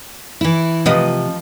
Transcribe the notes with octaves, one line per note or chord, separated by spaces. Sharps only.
E3 E4
C3 F3 B4 D#5